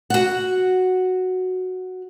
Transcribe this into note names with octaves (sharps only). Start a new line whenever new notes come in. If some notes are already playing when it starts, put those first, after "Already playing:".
F#4 F#5